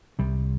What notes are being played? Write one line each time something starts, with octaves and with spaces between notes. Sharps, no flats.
C2 C3 G3